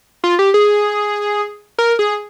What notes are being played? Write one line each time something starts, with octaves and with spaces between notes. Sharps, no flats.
F4
G4
G#4
A#4
G#4